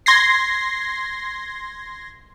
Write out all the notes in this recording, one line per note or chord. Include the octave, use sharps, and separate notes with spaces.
C6 G#6 A#6 C7